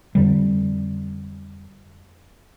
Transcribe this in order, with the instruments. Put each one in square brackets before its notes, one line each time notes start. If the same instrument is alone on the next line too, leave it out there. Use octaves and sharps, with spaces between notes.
[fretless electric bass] F2 D3 G3